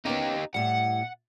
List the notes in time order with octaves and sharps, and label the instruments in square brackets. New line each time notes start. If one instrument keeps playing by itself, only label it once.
[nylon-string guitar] B3 C#4 [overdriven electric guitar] D#4 G4
[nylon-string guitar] A2 G3 [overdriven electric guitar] F#5